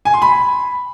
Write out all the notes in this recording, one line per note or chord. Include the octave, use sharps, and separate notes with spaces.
G#5
C6
B5